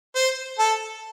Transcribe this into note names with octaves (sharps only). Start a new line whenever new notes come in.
C5
A4